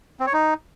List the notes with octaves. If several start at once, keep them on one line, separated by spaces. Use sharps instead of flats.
C4
C#5
D#4